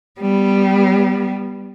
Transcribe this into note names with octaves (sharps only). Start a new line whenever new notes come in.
G3 B3